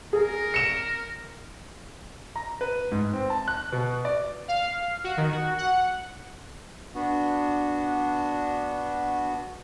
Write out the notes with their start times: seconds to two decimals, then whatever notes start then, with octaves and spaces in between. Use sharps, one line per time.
0.13 G#4 A#4
0.54 C#7 E7
2.36 A#5
2.61 B4
2.92 G#2
3.13 C4
3.30 A5
3.48 F#6
3.72 B2
4.05 D5
4.48 F5
5.04 F#4
5.17 D#3
5.32 F#4
5.58 F#5
6.95 B3 D4 F#4